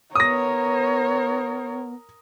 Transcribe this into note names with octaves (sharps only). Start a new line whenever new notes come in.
B3 A#4 C#5 D#6 A#6